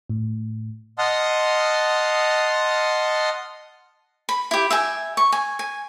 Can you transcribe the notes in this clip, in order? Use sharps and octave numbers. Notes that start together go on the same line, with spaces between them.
A2
D#5 F#5 A5 C6 D#6 F6
B5
E4 G4
E5 G5 G#5
C#6
G#5
G#5